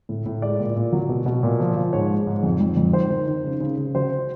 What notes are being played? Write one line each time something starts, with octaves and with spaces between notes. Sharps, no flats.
A2
A2
G#3 D5
A#2
A#2
F#3
B2
B2
A#2
F3
F3
G#2 C#5
G#3
G#2
F2
F2
F2
D#3 C5
D#3
D#3
C#3
C#3
C#3
F#3 C5